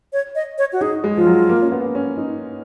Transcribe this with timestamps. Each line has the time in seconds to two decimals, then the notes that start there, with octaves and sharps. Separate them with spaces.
0.13 C#5
0.35 D#5
0.58 C#5
0.73 F#4
0.81 D#4 G#4
1.04 G#3
1.16 F3 F4
1.27 F#3
1.49 A#3
1.62 C#4
1.72 B3
1.95 C#4
2.17 D#4